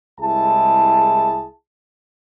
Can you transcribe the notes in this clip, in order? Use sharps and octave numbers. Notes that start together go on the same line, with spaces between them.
C2 G#3 E4 G#4 A5